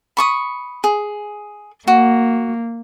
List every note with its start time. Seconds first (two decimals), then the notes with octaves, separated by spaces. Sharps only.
0.17 B5 C#6 D#6
0.84 G#4
1.88 A#3 F#4